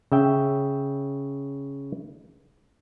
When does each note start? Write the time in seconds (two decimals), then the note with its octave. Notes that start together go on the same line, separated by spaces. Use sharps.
0.12 C#3 E5 G5